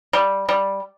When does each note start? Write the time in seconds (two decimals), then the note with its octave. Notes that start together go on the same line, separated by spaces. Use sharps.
0.13 G3
0.49 G3